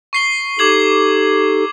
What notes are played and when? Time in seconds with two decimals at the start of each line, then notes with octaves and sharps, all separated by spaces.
0.13 C#6 C7 G7
0.59 D#4 G4 A4 D6 G#6 F#7